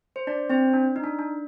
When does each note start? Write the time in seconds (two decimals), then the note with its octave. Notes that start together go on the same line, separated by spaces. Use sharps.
0.16 C5
0.27 D4 D5
0.50 C4 C5
0.73 D4
0.96 D#4
1.04 D4
1.19 D4